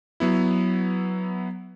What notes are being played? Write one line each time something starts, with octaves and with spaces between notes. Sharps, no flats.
F#3 B3 E4